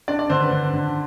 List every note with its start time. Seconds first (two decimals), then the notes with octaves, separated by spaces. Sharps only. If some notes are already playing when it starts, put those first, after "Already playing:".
0.08 D4 D5
0.19 D5
0.30 D3 C5
0.40 B4
0.51 D3
0.73 D3